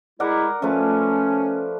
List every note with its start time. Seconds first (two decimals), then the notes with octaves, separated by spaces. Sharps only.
0.20 G#3 E4 A#4 D5 F#5
0.62 F3 A3 C#4 B4